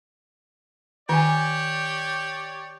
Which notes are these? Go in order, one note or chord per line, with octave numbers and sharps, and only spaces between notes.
D#3 G4 C#5 D5 G#5